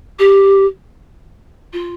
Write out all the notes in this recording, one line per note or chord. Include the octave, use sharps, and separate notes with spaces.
G4
F4